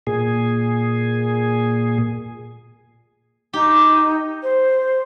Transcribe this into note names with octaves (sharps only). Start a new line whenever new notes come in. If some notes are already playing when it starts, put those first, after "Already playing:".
A#2 G#4
D#4 G4
C5